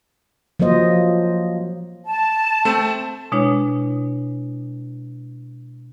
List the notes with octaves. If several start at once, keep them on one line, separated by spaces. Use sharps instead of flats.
F3 F#3 A#3 C5 D#5
A5
A3 C4
B2 G#3 D4 E4 C#5